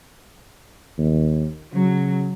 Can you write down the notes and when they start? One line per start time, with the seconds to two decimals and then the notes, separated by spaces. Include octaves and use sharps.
0.98 D#2
1.73 C#3 F#3